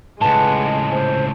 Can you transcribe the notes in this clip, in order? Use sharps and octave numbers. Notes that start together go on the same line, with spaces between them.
C#2 A2 G#3 B4 F#5 G#5 A5
C5